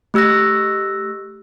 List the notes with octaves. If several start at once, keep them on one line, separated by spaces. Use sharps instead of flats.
A3 G4 E6 F#6 A#6